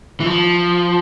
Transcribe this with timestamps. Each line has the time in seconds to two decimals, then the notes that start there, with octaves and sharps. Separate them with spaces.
0.20 E3
0.26 F3